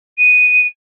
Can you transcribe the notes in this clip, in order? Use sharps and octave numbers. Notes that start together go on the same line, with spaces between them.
D#7